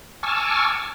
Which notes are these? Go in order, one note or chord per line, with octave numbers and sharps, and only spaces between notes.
G#5 A5 C#6 D6 E6 F6